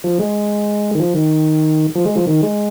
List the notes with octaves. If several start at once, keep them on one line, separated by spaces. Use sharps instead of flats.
F3
G#3
D#3
F3
D#3
F3
G#3
F3
D#3
G#3